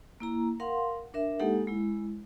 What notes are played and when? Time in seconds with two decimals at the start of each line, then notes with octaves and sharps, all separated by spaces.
0.20 A#3 E4 A#5
0.60 A#4 F5 F#5 C6
1.14 D4 A#4 E5
1.39 G#3 A#3 D#4 G4 A4 F#5
1.67 G#3 E4